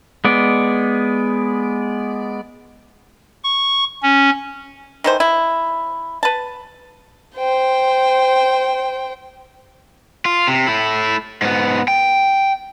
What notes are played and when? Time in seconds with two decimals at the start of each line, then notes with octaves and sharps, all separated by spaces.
0.25 G#3 B3 D5
3.44 C#6
4.03 C#4
5.04 D#3 E3 C5
5.20 E4
6.23 B4 A5
7.36 C5 G5
10.25 F4
10.48 C3
10.67 A3 E4
11.42 G#2 B3
11.88 G5